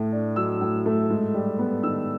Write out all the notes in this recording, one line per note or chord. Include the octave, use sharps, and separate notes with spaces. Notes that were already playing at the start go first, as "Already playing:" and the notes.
Already playing: A2 A3
D4
F#3 E6
A2
A3
G#2
G3
B3
D#3 E6